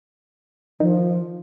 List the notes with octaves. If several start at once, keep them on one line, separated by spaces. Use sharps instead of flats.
D#3 F3